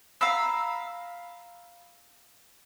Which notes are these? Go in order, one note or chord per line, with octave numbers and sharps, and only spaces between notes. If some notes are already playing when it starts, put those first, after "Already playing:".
F5 A#5 B5 E6